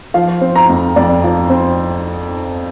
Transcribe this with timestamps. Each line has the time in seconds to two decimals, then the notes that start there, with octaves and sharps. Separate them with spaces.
0.14 F3 F5
0.41 C4
0.56 A#5
0.69 F2
0.96 F2 D5
1.24 F3
1.50 C4